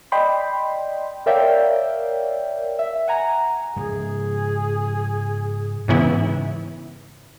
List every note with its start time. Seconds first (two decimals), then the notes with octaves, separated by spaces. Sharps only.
0.12 D5 D#5 G5 B5 C6
1.26 A#4 C#5 D5 E5 F5 G5
2.79 E5
3.08 F#5 G#5 A#5
3.76 G#2 C#3 F3 G#4
5.88 G#2 C#3 E3 B3 E4